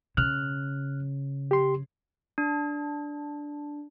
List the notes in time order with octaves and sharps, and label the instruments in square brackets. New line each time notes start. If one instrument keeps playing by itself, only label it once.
[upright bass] C#3 [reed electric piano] F6 F#6
[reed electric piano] G4 C6
[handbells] D4